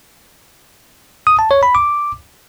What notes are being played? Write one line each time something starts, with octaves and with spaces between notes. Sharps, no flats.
D#6
A5
C#5
B5
D6